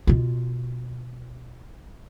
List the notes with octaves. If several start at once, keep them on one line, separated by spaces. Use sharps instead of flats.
B2 F4